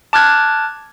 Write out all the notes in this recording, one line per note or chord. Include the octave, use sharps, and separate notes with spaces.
A5 D6 F6 F#6 G#6